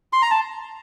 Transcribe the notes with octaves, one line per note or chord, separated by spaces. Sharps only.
C6
A#5
A5